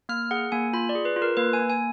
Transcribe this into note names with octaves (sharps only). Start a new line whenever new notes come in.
A#3 F6
G#4 F#5
A#3 G#5
F4 B5
D5
G#4
B4
F4
A#4
A#3 B4
G#5
A#3
G#5